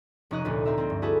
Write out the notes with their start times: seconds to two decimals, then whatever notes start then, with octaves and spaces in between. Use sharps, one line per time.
0.31 F1 C#4 D#4 D#5 F#6
0.44 F1 D2 A#2 B4
0.65 C4 A#4 E5
0.78 A#3 C4
0.90 G2
1.02 E4 F#4 G#4 A4 B4